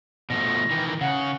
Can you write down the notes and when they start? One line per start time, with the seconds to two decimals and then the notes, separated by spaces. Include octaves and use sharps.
0.30 B2 F3 A3 A#6
0.71 D#3 E3
1.01 C#3 F#5